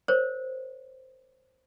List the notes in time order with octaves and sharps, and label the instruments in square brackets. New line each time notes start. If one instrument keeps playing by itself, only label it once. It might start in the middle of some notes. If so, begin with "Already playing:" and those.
[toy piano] A#4 C5 C#5